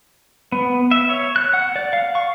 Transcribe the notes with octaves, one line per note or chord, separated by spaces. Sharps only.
B3
E5
C#5
F#6
F#5
D5
F5
C#6